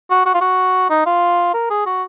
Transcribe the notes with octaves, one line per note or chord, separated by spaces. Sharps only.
F#4
F#4
F4
F#4
D#4
F4
A#4
G#4
F#4